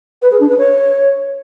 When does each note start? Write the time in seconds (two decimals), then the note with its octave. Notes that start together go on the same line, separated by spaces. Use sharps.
0.21 B4
0.30 G#4
0.39 D4
0.49 B4
0.58 C#5